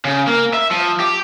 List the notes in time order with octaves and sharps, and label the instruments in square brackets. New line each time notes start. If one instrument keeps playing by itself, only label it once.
[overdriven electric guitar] C#3
A#3
E5
F3
G4